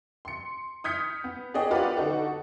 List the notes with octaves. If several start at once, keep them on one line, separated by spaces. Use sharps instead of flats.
C6 C#7
D#6 F6 G6 G#6 B6 C#7
B3
B3 D4 G#4 C#5 D#5 G5
F4 G4 A#4 B4 D5 F#5
D3 D4 D#4 F#4 A4